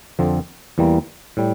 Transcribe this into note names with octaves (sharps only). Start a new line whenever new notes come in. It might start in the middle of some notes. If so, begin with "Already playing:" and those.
F2 D3 F3 C4
E2 E3 G3 A#3
A2 G3